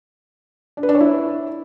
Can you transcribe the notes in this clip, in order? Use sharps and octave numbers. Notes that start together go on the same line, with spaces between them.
D4
B4
D4
C#5
E4